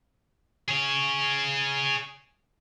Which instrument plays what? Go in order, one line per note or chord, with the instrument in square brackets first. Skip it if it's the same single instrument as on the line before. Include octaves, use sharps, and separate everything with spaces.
[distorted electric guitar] G#4 C#5